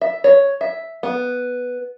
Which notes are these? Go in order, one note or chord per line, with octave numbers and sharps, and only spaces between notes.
E5
C#5
E5
B3